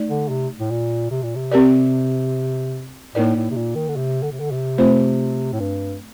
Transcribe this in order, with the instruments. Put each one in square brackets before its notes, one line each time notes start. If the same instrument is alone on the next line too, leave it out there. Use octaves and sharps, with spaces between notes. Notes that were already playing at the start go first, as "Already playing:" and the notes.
Already playing: [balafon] A3 D#4 D5
[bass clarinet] D3
C3
A2
A#2
C3
A#2
C3
[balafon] C4 G4 A#4 D5
[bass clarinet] A2 [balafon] A#3 D#4 A#4 D5
[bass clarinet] A2
C3
A#2
D#3
D3
C3
D3
C3
D3
C3
[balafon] A3 C4 F4 C5
[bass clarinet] A2
G2